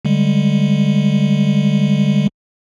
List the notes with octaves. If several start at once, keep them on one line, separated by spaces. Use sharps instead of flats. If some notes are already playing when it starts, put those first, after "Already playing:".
D3 G3 G#3